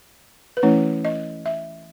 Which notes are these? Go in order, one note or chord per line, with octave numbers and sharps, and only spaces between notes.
B4
E3 A3 C#4 E4 C#5
D#5
E5